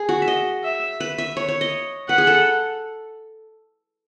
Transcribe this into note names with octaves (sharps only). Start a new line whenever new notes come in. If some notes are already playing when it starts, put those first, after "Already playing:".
Already playing: G#4
F#4
E5
D#5
E5
B4
E5
C#5
C#5
D#5
B4 F#5
G#4
A4